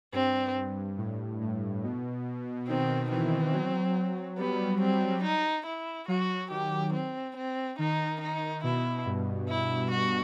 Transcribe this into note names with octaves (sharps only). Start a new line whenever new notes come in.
G2 C4
A2
A2
B2
D#3 C4
E3 C4
F#3
G3 B3
C4
D#4
E4
F#3 F#4
D#3 G4
C4
C4
D#3 D#4
D#4
B2 E4
G2
E4
F#4